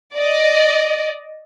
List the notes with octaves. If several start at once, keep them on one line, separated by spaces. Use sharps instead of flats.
D5 D#5